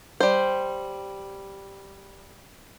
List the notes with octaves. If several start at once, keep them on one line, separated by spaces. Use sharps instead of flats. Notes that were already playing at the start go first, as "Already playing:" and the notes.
G3 C5